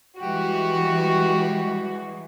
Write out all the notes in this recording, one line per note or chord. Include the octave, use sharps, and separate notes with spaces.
E3 G3 G#3 F#4 G4